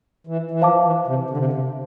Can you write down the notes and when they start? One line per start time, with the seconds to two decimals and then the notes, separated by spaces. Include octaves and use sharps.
0.27 E3
0.51 E3
0.62 F3 C5 F5 A5 D6
0.85 E3
1.07 C3
1.30 D3
1.37 C3
1.45 D3
1.53 C3